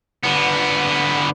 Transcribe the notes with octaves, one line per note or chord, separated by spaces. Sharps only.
D3 B3